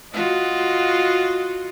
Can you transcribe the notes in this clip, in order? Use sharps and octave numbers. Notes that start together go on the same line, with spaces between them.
F4 F#4 D#5